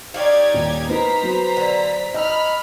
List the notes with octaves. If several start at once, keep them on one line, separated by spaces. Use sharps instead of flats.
D#4 G4 C#5 D5 F5 G#6
D#1
B3 D#4 A#4 C5 A#5 B6
F#3 B3
D3
D#4 D#5 B5 E6 F6